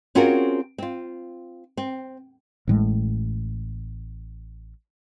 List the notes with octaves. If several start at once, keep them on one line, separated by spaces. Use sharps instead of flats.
C4 C#4 F4 F#4 G#4 A#4
C4 F4
C4
A1 A2 G#3